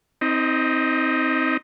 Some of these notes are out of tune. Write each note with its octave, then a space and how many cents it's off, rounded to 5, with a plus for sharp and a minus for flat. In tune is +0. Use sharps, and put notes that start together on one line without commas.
C4 +0 D#4 +35 D#5 -15